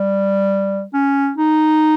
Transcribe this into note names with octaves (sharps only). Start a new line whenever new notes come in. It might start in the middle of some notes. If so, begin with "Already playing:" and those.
Already playing: G3
C#4
D#4